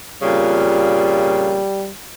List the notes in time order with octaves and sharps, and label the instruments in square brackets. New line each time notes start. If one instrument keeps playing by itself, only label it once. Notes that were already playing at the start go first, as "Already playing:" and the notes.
[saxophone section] F2 A#2 C#3 [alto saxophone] G3